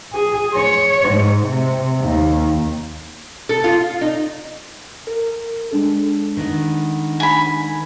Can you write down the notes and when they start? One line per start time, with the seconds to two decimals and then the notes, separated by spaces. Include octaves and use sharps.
0.13 G#4
0.54 C#5
1.09 G#2
1.45 C3
2.01 D#2
3.49 A4
3.64 F4
3.81 F4
4.01 D#4
5.07 A#4
5.71 G#3 D4 A4
6.37 D#3 B3
7.20 G#5 B5